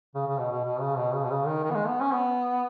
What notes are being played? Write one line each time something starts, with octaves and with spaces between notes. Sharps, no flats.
C#3
C#3
B2
B2
B2
C#3
B2
C#3
B2
C#3
D#3
D#3
B3
G#3
B3
C#4
B3